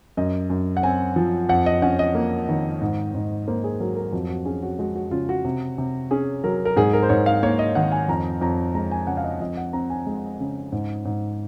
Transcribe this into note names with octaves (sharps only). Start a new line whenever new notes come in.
F#2 D#5
F#2
F#5
C4 G#5
F3
F2 F#5
D#5
C#4 F#5
D#5
A#3
D#3
G#2
G#2
A#3 C5
G#4
F#3 A#4
A#4
F2 F#4
F#4
C#4 G#4
F#4
G#3 F#4
F#4
C#3 F4
F#4
C3
C3
C#4 G#4
F#3 A#4
A#4
G#2 G#4
A#4
C5
G#2 C#5
F5
A#3 C#5
D#5
D#3 F#5
G#5
F2 A#5
F2 A#5
G#3 A#5
G#5
C#3 F#5
F5
D#5
F2 D#5
F#5
C4 A#5
G#5
G#3
C#3
G#2
G#2